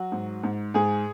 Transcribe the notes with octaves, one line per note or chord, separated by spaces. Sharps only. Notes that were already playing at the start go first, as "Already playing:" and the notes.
Already playing: F#3 F#4
G#2
G#2
G#2 G#4